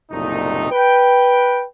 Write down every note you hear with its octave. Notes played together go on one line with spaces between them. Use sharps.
F#1 C2 A#2 A3 D#4
B4 G5